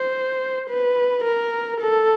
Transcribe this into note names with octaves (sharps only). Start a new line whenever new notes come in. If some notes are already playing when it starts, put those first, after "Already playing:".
Already playing: C5
B4
A#4
A4